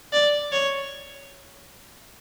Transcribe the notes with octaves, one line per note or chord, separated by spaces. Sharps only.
D5
C#5